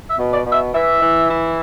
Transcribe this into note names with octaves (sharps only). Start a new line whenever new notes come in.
E5
B2
D5
B2
E5
E3 E5
E3
E4